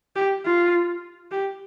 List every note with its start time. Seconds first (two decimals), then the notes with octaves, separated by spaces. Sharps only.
0.16 G4
0.45 F4
1.31 G4